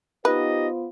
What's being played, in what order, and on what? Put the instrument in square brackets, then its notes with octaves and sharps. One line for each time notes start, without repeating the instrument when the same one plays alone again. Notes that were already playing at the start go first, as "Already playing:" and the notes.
[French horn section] B3 F4 C5 [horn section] D#4 G4 D#5 [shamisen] B4